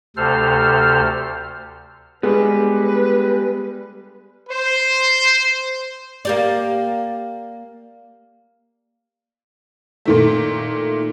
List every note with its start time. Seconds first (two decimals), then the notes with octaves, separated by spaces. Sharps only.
0.17 D2 C3 A4 C5 F6
2.23 G3 G#3 B3 B4
4.50 C5
6.25 A#3 G4 D5
10.05 A#2 D#3 A3